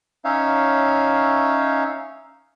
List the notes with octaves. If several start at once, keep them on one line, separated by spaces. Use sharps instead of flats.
C#4 D#4 C#5 E5 F5